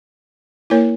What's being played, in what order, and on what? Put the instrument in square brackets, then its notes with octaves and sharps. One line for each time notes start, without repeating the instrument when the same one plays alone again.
[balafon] A#3 E4 A#4 C#5